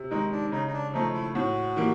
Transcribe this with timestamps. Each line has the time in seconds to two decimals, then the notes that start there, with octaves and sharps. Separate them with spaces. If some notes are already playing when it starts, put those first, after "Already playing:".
Already playing: C3
0.11 D#3 G#3 D#4
0.32 D4
0.52 C#3 D#4
0.67 D#4
0.73 D4
0.93 F3 A3 D#4
1.14 E4
1.34 A2 F#4
1.76 E3 G3 A#3